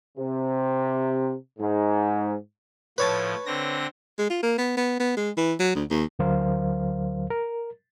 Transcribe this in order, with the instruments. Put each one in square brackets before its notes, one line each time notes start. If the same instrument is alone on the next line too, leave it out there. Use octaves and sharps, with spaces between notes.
[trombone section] C3
G#2
[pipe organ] A2 F3 [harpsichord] B4 C#5 A5
[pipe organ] D3 C4 A#6
[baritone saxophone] G#3
F4
A#3
B3
B3
B3
G#3
E3
F#3
D2
D#2
[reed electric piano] D2 D3 F#3 A#4 C5 F5
A#4